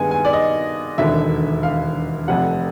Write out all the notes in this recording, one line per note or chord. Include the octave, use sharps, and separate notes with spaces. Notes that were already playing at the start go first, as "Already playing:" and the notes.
Already playing: G2 D#3 G#3 B3 G#5
G#5
D5
D#5
E1 D#2 D3 E5
F5
F1 F2 C3 F#5